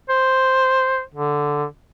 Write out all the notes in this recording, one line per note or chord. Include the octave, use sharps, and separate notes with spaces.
C5
D3